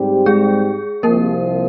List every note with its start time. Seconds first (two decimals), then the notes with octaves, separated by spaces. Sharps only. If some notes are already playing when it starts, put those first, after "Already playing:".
Already playing: G#2 G3 C4 G4
0.26 G#3 G#4
1.03 C2 C3 F3 A#3 A#4